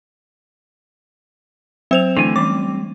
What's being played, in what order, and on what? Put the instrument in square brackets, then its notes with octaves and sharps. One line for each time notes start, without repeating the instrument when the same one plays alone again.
[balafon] F#3 [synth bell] C4 C5 F7
[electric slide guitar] D3 E3 G#5 [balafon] A3 D4
[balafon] E3 C#4 [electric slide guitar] G3 C4 [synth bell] D6